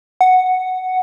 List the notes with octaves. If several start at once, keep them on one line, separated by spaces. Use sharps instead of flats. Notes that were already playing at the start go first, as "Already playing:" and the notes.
F#5